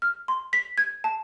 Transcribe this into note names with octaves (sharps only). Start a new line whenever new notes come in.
F6
C6
B6
G#6
A5